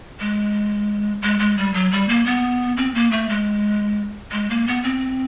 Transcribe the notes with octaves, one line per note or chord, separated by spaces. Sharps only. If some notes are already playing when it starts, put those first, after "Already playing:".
G#3
G#3
G#3
G3
F#3
G3
A#3
B3
C4
A#3
A3
G#3
G#3
A#3
B3
C4